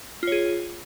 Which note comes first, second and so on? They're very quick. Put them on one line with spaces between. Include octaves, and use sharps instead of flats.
F4 C#5 G#4